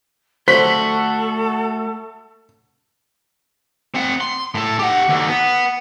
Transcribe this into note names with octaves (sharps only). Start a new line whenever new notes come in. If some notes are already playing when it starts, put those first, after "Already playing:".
A3 F#4 A4 C5 B6
C4 F#5
C6
A2 A4
G4 F#5
D#2 D3
B3